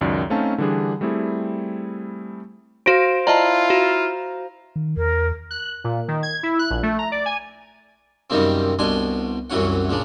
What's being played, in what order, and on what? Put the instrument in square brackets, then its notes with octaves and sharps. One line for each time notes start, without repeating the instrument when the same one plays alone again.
[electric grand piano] C#2 F#2 D#3 D5
A3 C4 C#4 D#4 F5 A5
D3 E3 G3 D4 G#4
G3 A3 C4 E4 G#4
[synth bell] F#4 A#6 D7 [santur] C5 F5
[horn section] E4 F4 [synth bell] D5 D#5 A5 [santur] A#5
[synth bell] F#4
[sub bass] D#3
[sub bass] E2 [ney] A#4
[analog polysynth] F#6
A#2
D#3
G#6
E4
F#6
A#1
A3
A#5
D5
G#5
[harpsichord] F#2 C3 D#3 G3 A#3 C4
C2 B2 D4 G#5 C6
C2 F#2 E3 F#3 C#4 F#5
A#2 C#3 D4